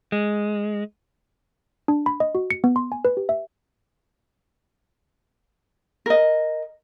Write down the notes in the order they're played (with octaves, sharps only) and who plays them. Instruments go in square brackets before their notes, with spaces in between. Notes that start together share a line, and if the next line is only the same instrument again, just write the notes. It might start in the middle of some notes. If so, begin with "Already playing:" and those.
[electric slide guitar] G#3
[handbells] D4
B5
D#5
F#4
C#7
B3
C6
G#5
B4
G4
E5
[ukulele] A#4 D#5